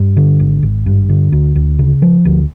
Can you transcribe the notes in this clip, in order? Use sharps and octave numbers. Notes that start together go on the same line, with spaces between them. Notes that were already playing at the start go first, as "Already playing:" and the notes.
Already playing: G2
D3
G#1
G#1
G2
D3
D2
D2
C#3
F3
D2